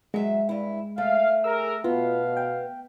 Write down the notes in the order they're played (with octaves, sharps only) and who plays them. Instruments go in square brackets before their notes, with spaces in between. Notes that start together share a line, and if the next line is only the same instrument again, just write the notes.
[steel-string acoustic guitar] F#3 E5 [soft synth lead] G#3
[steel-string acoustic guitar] G2 E4
[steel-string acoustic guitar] A3 [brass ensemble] F5
[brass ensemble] G#4 A#4 [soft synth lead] E6
[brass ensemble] B2 F5 [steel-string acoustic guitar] B3 [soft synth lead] F4
[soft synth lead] G5